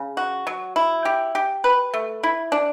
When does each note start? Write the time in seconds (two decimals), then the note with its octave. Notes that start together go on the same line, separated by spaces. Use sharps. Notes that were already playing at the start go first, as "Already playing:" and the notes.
Already playing: C#3
0.17 F#4
0.47 F#3
0.76 E4
1.05 G4
1.35 G4
1.64 B4
1.94 A3
2.23 E4
2.52 D4